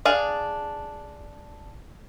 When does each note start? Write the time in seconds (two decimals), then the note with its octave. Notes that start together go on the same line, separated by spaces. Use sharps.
0.05 D4 G#4 F5